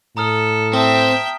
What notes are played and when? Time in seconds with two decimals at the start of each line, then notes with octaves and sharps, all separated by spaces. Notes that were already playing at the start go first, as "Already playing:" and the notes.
0.17 A2 A4 A#5 D#6 F6
0.73 C4 E5 G5 A5 D#6 G7